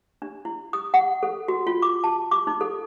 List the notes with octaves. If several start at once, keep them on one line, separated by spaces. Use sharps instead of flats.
D4
E4
D#6
F#5
A4
F#4
F4
D6
A5
D6
D#4
A4